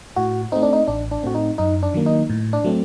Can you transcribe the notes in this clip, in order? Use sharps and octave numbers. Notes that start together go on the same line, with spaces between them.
A2 F#4
A3 C4 D#4
D4
D#4
A1 D4
D4
A2 A3 C4 F#4
D#4
F#2 D#4
D4
D#3 F#3 A#3
D#4
A2
D4
F#3 A3 C4